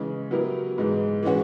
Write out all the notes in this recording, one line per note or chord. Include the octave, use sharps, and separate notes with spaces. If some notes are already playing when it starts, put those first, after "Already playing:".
Already playing: C#3 E3 G#3
F#3 B3 E4 G4 A#4
G#2 E3 G#3
E3 G#3 C#4 F#4